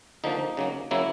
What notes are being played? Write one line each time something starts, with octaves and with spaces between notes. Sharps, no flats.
D3 F3 A#3 D#4
C#3 F#3 A#3
C#3 F#3 A#3 E4